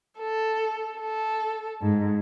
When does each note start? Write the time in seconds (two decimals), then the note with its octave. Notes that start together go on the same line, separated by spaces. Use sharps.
0.19 A4
0.98 A4
1.82 G#2